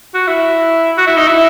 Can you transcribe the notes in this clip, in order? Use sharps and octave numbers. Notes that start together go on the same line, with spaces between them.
F#4
E4
F#4
E4
D#4
E4